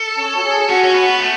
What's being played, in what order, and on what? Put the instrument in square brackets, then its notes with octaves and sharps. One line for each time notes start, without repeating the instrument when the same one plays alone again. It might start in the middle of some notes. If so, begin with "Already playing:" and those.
Already playing: [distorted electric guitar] A4
[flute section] C#4 C#5
F#4
G#4
[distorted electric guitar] C#4 [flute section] F#4
[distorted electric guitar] C#4
B3
A3